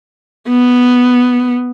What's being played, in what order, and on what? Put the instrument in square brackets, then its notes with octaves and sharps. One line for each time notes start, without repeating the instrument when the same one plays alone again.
[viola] B3